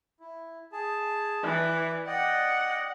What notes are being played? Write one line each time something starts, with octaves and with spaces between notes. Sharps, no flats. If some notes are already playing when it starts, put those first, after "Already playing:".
E4
G#4 A5
E3 B4 D5
D5 D#5 F#5 G5